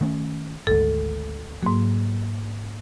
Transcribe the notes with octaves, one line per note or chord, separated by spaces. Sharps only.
D#3 A3 C#4
G#1 D2 G#2 A4
G#2 F#3 A#3